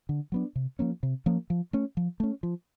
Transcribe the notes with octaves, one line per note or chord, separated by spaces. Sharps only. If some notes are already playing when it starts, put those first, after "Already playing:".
D3
F#3 B3 D4
C3
F3 A#3 C#4
C3
F3 A#3 C#4
F3
A3 C#4
F3
A3 C#4
F3